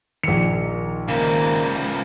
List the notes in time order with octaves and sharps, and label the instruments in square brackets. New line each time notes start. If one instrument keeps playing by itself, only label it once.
[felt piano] A#1 C#7 [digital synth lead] D#3
[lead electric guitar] C#3 F3 [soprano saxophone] A#3